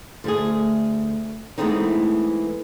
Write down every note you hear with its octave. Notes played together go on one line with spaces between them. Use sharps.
D2 A3 G#4
E3 G#3 A3 B3 C4 D#4